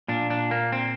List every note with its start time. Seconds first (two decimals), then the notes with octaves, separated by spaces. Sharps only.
0.08 A#2 D4
0.30 D4
0.51 A#3
0.72 C4